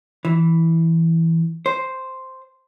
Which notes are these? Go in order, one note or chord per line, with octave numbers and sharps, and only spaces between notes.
E3
C5